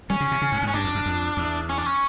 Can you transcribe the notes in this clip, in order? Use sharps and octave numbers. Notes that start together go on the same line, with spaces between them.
G3 C#4
C#3
C3
C#3
G#2
G#2
C#4
G2 D4
F2
F#2
F2
E2
C#4
D4
C#4